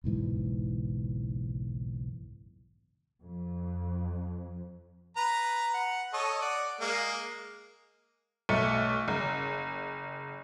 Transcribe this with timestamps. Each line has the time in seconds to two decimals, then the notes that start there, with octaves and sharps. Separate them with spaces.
0.04 F#1 B1 G#2 E3
3.22 F2
5.17 B4 A#5
5.74 F#5
6.13 A4 C#5 D#5
6.41 D5 F#5
6.81 G#3 A#3
8.49 B1 A3 C#7
9.08 F#1